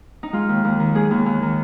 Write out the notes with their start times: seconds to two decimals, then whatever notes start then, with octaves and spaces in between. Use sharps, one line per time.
0.23 D#4
0.33 G#3 F4
0.49 D#2
0.64 D#2
0.80 D#3
0.95 G#3 G#4
1.11 D#2
1.26 D#2
1.43 D#3